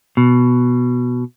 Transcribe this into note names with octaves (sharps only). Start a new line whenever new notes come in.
B2